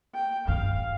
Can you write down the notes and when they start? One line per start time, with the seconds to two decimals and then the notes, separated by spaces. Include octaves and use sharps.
0.15 G5
0.48 G2 F5